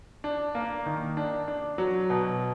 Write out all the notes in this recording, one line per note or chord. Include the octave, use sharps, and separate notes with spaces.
D4
A#3
D#3
D4
D4
F#3
B2